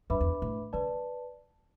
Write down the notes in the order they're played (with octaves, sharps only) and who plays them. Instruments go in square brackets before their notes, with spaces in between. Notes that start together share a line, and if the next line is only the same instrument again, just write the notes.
[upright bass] F#2 [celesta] D4 B4 E5 B5 D6
[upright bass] E2
A2
[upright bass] D3 [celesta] B4 D5 A5